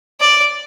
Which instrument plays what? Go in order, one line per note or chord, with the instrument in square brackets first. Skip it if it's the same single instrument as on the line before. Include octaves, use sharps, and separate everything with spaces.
[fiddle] D5